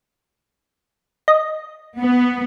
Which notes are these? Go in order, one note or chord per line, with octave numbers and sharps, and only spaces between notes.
D#5
B3